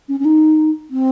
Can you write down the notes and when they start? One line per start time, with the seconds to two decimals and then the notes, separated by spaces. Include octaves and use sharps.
0.09 C#4
0.20 C#4
0.25 D#4
0.90 C4